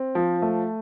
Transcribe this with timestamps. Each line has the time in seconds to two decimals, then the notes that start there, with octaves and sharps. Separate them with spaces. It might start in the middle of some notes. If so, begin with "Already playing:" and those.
Already playing: C4
0.15 F3
0.42 A3